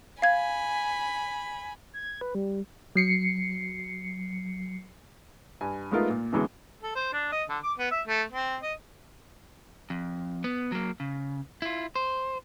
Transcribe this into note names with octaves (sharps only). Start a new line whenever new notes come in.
F5 G#5 B5 G#6
G#6
B4
G3
F#3 C7 C#7
G2 G#5
G#3 A3 B3 D#4 F4 A#4
A#2
F#2 B2 D3 E3 G#3
A4
C5
D4
D#5
D3
D6
B3
E5
A3
C4
D#5
F2
B3
F#3 A#3
C#3
E4 F4
C5